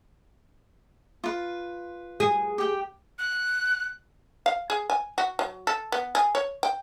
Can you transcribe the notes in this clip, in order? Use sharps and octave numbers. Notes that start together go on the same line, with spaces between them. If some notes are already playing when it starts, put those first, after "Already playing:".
F4 B4
G#4
G4 G5
F#6
F5
G#4
G#5
F#4
F#3
A4
B3
G#4
C#5
G5